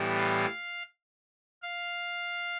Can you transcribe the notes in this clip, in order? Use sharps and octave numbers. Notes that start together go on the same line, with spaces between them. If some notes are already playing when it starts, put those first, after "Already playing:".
Already playing: A2 E3 G3 B3
F5
F5